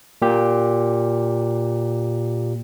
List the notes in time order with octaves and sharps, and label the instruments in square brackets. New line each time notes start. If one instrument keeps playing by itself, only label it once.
[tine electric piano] A#2 G4